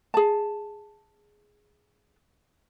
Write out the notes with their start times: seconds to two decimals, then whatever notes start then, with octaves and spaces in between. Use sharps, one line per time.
0.14 G#4 A5